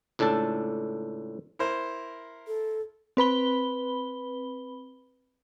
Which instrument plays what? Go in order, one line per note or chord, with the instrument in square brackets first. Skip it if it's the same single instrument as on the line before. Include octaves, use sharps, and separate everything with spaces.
[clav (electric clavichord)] C#2 A2 D4 A4 A5
[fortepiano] E4 A#4 C5
[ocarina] A4
[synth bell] C4 B4 B5 G7